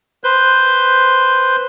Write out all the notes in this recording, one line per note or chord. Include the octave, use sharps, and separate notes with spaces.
B4 C5 G6